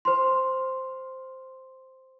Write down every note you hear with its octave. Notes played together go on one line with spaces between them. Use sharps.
C5 C6